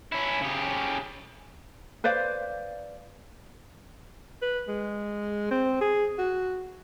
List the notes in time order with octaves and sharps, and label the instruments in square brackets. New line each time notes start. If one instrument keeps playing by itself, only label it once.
[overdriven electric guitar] C#4 E4
C#3 G4
[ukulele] B4 C5 D5 F5
[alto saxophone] B4
G#3
C4
G#4
F#4